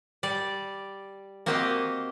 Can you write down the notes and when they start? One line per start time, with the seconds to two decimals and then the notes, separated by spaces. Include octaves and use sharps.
0.23 G3 D5
1.46 A#3 C4 F#4 G4 D#5 G5